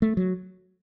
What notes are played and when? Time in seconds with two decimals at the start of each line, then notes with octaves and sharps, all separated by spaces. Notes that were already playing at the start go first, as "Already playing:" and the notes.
0.02 A3
0.17 F#3